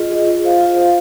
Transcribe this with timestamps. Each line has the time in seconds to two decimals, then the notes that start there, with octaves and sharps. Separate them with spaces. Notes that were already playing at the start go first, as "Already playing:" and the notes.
Already playing: F4 G#4 D#5
0.11 G#4 D#5
0.27 F4
0.44 C5 F5
0.61 F4
0.77 C5 F5